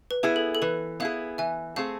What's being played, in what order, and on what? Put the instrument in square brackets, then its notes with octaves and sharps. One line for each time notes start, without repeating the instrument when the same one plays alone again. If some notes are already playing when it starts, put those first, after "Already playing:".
[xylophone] B4
[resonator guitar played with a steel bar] B3 E4 G#4
[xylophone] A4
A4
[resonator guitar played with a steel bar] E3 [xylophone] B4
[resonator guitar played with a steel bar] B3 E4 G#4 [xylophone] F5
[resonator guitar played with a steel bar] E3 [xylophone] E5 G#5
[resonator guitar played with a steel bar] A3 C4 G#4 [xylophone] F5